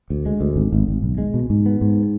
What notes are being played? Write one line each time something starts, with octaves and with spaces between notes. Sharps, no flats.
D2
G#3
D2
G#1
G#1
G#1
B1
G#3
B2
G#2
B3
G#2